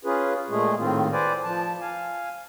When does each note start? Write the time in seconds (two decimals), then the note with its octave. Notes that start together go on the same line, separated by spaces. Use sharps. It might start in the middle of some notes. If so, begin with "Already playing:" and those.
0.05 C#4 F4 G#4 B4
0.50 A#2 G#3 A3 G#4
0.78 A2 D#3 C4 F4
1.12 B4 C5 D5 G#5
1.44 F3 A5
1.81 F5 G#5